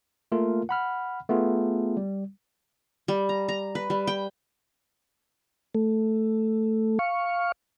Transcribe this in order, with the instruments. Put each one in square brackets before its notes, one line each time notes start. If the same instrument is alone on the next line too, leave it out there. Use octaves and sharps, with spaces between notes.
[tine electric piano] A3 A#3 F4 A#4
F#5 B5 F6
A3 B3 F4 G#4
G3
[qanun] G3
A#5
A#5
B4
G3
G5
[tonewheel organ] A3
F5 C#6